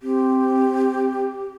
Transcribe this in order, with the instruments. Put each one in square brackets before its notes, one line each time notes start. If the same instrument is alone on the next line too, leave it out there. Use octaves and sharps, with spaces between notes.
[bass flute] C4 [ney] G4